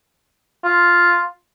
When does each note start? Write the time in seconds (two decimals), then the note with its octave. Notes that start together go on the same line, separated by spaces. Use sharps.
0.65 F4